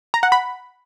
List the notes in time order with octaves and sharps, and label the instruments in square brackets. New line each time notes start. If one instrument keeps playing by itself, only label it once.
[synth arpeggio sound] A#5
F#5
B5